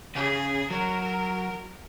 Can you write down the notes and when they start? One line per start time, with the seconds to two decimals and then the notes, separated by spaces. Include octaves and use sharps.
0.15 C#3 G#4
0.70 F#3 A#4